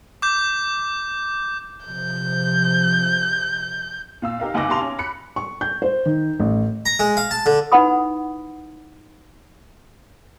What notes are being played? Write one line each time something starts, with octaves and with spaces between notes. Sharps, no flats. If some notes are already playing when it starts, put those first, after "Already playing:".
D6 G6
C3 F3 G6
A#2 F5 E6
D#4 G4 A#4 F5
F#1 C#2 D#4 G#5 D6 A#6
B1 G4 A5 C6 F7
C#4
B5 F#6 C#7
C#6
G6
C5
D#3
A1
A#5
G#3
F5
A5
D3
D#4 E4 B4 F#5 B5 D#6